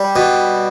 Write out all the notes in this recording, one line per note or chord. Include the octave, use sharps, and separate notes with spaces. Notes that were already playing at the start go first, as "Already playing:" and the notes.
Already playing: G3
B2